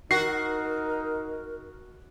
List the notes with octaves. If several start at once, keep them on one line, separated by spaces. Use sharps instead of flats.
D#4 F#4 A#4 C7